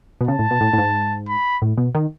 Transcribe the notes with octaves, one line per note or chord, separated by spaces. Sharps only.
B2
C#3 A5
A2
B2
A2
A2
G#2
B5
A2
B2
D#3